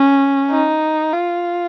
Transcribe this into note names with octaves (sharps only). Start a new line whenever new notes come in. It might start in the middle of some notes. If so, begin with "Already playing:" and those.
Already playing: C#4
D#4
F4